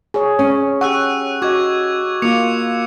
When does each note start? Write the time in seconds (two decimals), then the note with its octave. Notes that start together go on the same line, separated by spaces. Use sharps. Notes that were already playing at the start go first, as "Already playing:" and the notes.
0.14 G#4 C#5
0.39 C#4
0.81 G4 F#5 C#6 E6 F#6
1.42 F#4 D#5 C#6 D6 G#6
2.22 A#3 F4 D6 C#7 F7